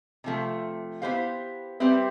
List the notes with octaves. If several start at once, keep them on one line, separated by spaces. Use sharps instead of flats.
C3 F3 A3
B3 E4 G4 C5 F5
G3 C4 G4 B4 E5